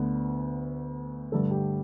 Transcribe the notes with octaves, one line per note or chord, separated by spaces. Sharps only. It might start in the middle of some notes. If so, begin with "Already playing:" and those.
Already playing: D2 D3 B3 B4
G2 D3 A3 A4
G4